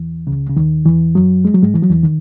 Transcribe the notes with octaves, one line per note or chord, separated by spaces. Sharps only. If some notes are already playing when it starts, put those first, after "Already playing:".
Already playing: E2 E3
C#2 C#3
C#3
D#2 D#3
E2 E3
F#2 F#3
G#3
F#3
G#2 G#3
E3
F#3
E2 E3
D#3